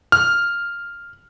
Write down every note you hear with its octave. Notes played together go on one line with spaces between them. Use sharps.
F6